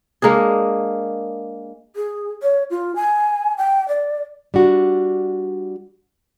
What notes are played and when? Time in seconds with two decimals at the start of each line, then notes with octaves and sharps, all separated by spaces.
0.22 G#3 A#3 D4 G#4
1.96 G#4
2.43 C#5
2.70 F4
2.96 G#5
3.58 G5
3.88 D5
4.54 G3 D4 F#4